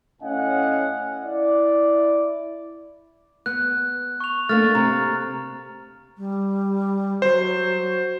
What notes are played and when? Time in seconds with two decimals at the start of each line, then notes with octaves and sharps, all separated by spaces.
0.22 A2 C#4 D#5 F5 F#5 G#5
1.23 E4 D5
3.46 B3 F#6
4.20 C#6 F7
4.49 A3 A#3 D4 F6 A6
4.75 C3 A#5
6.16 G3
7.22 F#3 C5